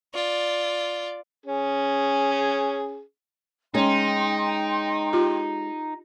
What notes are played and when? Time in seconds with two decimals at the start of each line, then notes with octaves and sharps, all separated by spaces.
0.14 F4 D5
1.46 C#4 G#4
3.74 G#3 C#4 D#4 G5 C6
5.13 F4 G4